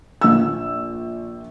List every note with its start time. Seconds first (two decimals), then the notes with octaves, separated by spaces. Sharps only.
0.21 A#1 E6